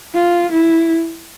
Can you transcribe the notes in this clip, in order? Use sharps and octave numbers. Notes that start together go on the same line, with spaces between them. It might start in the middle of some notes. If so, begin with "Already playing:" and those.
F4
E4